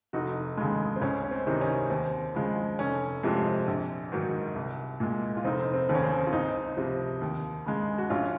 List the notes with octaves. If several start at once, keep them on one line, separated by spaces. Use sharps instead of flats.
F1 D#4 F#4
D#2 C#3 G#3
C4
C#2 C#4
C#4
C4
C3 D#3 D#4
C#4
D#2 C4
C#3 F3 G#3
F1 C#4
F2 C3 F3 G#3
A#1
G#2 D#3 F#3
C2
A#2 G#3
F4
F1 C4 D#4
C4
D#2 C#3
C#4
C4
F4
C#2 C4 D#4
C3 F3
D#2
C#3 G#3
F#4
A#1 C#4 F4